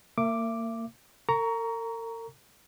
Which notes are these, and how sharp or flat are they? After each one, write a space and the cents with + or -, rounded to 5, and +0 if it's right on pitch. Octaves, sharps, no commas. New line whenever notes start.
A#3 -30 E5 +35 D6 +0
A#4 -45 A#5 +0 C#6 +25